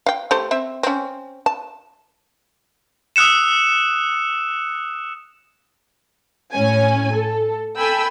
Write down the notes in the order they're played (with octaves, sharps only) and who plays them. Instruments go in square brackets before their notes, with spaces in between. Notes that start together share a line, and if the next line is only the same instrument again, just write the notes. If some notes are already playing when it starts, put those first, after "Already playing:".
[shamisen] F5 G5
A3 G4 C5
C4 E5
C4 C#4
A5
[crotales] D#6 E6 F#6 C#7 E7
[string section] A2 C#4 G#5
A4
A4 G5 G#5 B5 E6